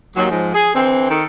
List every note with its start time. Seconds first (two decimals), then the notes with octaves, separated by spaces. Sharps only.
0.15 D#2 F#3
0.29 G#2 F3
0.54 G#4
0.74 D3 E3 C4
1.09 D#3 A4